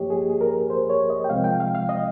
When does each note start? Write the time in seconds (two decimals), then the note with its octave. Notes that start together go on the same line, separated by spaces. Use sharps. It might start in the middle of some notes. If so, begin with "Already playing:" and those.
Already playing: G2 F3 A#3 G4 C#5 D#5
0.10 G#4
0.30 G#4
0.41 A#4
0.70 C5
0.90 C#5
1.10 D#5
1.24 G5
1.30 C2 C3 F3 G#3 C4 F5
1.44 G5
1.60 F5
1.75 F5
1.89 D#5